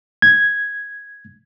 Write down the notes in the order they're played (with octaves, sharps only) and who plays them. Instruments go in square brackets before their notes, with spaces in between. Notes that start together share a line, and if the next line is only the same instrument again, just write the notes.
[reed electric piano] G#6